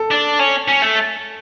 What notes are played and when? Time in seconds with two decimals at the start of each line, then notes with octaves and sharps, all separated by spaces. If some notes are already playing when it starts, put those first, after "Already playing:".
Already playing: A4
0.11 D4
0.39 C#4
0.68 C#4
0.82 A3